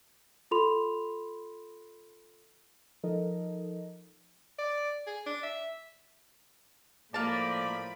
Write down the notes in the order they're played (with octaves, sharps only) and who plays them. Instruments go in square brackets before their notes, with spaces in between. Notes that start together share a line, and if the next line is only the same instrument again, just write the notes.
[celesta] F4 A4 B5 C6 F7
[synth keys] F3 D#4 A4 A#4 D#5
[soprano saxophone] D5
G#4
D4
E5
[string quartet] A2 F3 B5 [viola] A#3 [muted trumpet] D5 [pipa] F5 A5